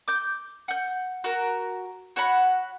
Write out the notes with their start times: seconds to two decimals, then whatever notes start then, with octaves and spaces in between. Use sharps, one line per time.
0.08 D6 G6
0.68 F#5 G6
1.24 F#4 A#4
2.16 F#4 C#5 F#5 B5